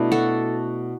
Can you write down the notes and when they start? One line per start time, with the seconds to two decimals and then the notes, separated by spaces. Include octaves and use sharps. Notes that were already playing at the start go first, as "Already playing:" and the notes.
Already playing: B2 A3 D4 E4 B4
0.11 F#4 A4